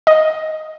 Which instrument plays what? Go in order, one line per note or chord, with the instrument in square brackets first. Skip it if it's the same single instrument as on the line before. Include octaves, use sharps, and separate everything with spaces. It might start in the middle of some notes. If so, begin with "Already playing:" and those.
[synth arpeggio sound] D#5